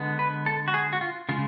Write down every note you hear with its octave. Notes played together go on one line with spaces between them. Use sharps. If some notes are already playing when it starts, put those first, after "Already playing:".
Already playing: D3 G#3 B3
B4
A4
F#4
G#4
F#4
F4
C#3 G#3 F4